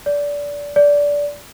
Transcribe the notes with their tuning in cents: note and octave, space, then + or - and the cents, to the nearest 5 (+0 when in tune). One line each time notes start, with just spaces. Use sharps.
D5 -20
D5 -15